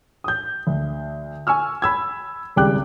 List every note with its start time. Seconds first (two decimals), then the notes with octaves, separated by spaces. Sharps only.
0.24 D#6 G6
0.67 D2
1.47 G#5 C#6 E6 F6
1.82 B5 E6 G#6
2.56 G#1 C#2 G3 G5 D6 F#6